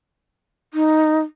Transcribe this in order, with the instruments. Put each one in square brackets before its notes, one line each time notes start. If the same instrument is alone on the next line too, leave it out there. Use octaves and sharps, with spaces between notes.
[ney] D#4